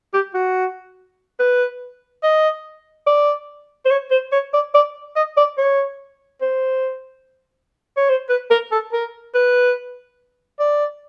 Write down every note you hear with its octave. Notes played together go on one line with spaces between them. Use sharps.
G4
F#4
B4
D#5
D5
C5
C#5
C5
C#5
D5
D5
D#5
D5
C#5
C5
C#5
C5
B4
A#4
A4
A#4
B4
D5